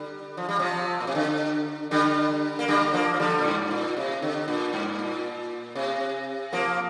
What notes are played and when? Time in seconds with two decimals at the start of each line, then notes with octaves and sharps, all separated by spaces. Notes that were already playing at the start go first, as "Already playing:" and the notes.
Already playing: D3 G3
0.37 F3
0.49 G3
0.59 C3 F3
1.00 A#2
1.07 C3
1.15 D3
1.91 D3 G3
2.59 A#3
2.68 D3 G3
2.93 F3 A#3
3.14 F3
3.20 D3 G3
3.38 A#2
3.45 G2
3.71 A#2
3.97 C3
4.22 D3
4.48 A#2
4.73 G2
4.99 A#2
5.75 C3
6.53 F3 A#3